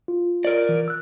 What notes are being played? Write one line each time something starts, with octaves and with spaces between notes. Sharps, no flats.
F4
A#4 D5
E3
E6 F#6